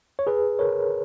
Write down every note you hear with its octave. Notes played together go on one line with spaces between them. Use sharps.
C#5
G#4 B4
A#4 C#5